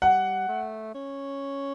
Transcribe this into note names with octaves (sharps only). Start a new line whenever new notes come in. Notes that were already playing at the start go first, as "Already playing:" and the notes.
G3 F#5
A3
C#4